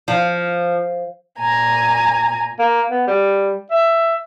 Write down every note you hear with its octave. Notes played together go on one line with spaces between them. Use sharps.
F3
A#2 G#5 A#5
A#3
B3
G3
E5